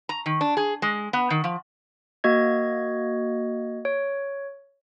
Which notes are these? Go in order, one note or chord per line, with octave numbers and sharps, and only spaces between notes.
A#5
D#3
D4
G#4
G#3
B3
D#3
F3
A#3 F#4 D#5 G#6
C#5